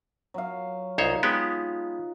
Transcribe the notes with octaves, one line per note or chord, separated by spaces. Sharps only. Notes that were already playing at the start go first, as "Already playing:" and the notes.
F#3 F5
C2 D#4 F4 C5 C#5
G#3 B3 G4